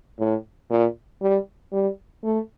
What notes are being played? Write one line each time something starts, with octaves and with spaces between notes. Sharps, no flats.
A2
A#2
G3
G3
A3